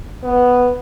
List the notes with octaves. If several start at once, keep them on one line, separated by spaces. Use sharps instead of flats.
B3